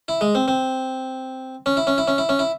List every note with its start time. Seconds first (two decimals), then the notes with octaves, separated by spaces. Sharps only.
0.08 E4
0.21 G#3
0.35 C4
0.48 C4
1.66 C#4
1.77 E4
1.87 C#4
1.98 E4
2.07 C#4
2.18 E4
2.29 C#4
2.39 E4